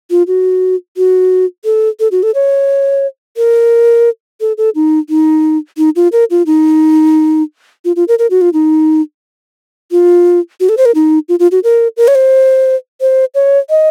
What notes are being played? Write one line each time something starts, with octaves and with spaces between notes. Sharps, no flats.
F4
F#4
F#4
A4
A4
F#4
A4
C#5
A#4
A4
A4
D#4
D#4
D#4
F4
A#4
F4
D#4
F4
F4
A#4
A#4
F#4
F4
D#4
F4
F#4
A4
C5
A#4
D#4
F4
F4
F#4
A#4
A#4
C#5
C5
C5
C#5
D#5